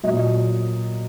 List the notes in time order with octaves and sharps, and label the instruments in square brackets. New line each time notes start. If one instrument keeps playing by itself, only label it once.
[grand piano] A#2 F#3 D#5